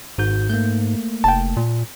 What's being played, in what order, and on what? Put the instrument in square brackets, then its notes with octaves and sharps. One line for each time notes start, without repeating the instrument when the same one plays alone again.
[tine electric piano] G#1 F#4 G6 [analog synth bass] G#2
[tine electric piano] A3 A#3 [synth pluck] G6
[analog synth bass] F1 [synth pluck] G5 A5
[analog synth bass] A#2